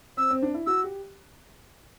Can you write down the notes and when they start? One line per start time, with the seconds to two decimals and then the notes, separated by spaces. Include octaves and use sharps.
0.17 C4 E6
0.30 C4
0.42 D4
0.54 E4
0.66 F#4 E6
0.84 G4